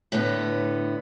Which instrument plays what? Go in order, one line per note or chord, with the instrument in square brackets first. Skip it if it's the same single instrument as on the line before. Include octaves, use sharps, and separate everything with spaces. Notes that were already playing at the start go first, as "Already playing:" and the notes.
[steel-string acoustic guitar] A2 D3 A3 B3